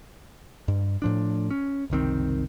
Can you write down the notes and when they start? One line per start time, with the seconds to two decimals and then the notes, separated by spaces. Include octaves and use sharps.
0.68 G2
1.02 A2 F3 D4
1.51 C#4
1.90 F#1 C2 D#3 C4